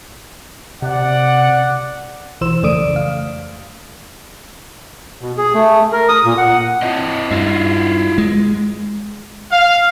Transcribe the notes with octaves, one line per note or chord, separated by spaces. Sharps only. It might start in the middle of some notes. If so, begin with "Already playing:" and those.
C3 D5 F#5
B1 E3 C5 E6 E7
F2 C#3 A3 D5 D#6 D7
F5
B2
G#4
A3
A#4
D#6
A#2
F#5
C4 E4 D#5
G2 E4 F4
G#3
F5